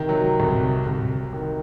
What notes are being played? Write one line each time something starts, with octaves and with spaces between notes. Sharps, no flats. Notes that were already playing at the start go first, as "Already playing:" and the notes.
Already playing: C3 D#3
F#3
C2
C2
D#3